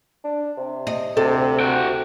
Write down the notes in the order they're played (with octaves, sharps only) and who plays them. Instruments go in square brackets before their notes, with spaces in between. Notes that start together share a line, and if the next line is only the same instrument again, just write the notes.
[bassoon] D4
C3
[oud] D#5
[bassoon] D2 [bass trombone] C3 [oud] A4
[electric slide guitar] F#4 F#5 G5